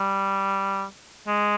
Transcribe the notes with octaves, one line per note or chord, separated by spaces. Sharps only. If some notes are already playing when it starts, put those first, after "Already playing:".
Already playing: G3
G#3